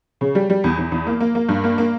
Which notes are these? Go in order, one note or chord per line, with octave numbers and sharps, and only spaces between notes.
C#3
G3
G3
E2
E2
E2
A#3
A#3
A#3
G2
A#3
A#3